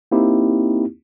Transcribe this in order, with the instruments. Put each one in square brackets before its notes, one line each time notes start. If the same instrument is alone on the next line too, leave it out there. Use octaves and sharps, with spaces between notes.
[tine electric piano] A#3 C4 D#4 E4 G4